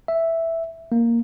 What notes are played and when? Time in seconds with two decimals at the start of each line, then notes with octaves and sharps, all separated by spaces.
0.08 E5
0.92 A#3